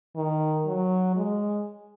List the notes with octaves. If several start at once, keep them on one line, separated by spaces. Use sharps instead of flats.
D#3
F#3
G#3